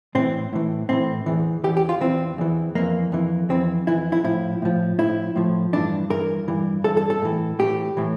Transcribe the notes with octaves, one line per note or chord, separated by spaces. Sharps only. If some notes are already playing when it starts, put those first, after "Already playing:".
A2 E3 C4
A2 E3
A2 E3 C4
E2 E3
E2 E3 G4
G4
F4
E2 E3 C4
E2 E3
F2 E3 A#3
F2 E3
F2 E3 C4
F2 E3 E4
E4
A2 F3 E4
A2 F3
A2 F3 E4
A2 F3
G2 E3 D4
G2 E3 A#4
G2 E3
G2 E3 A4
A4
A4
A2 E3
A2 E3 G4
A2 E3